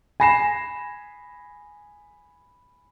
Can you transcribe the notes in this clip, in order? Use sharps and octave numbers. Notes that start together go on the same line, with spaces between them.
G#5 B5 A#6 C7 E7